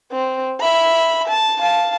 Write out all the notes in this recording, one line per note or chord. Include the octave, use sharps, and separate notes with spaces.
C4
E5 B5
A5
F5 A5